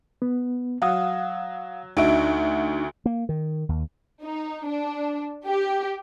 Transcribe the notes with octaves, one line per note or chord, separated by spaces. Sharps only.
B3
F#3 F5 F#5 D#6
D2 D4 D#4 F#4 E5 D7
A#3
D#3
D#2
D#4
D4
G4